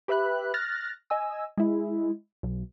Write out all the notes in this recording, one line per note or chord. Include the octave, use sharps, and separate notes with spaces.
G4 B4 E5 B5 F#6
F6 F#6 A6 A#6
D#5 G#5 E6
G#3 E4
B1